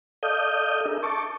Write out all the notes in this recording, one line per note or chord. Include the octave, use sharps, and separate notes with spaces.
A4 D5 D#5 F5 D#6 G6
D4 G#4 A#4 E5
A5 C#6 D6